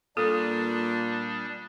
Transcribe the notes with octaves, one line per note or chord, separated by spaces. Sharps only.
A#2 G3 D4 A4 D#6